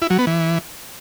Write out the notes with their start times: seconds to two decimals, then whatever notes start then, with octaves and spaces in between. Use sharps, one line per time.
0.02 E4
0.10 F#3
0.19 B3
0.27 E3